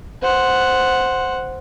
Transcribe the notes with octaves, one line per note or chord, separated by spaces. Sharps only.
C5 F#5